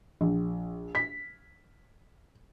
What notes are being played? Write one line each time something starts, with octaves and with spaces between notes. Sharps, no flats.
A#1
B6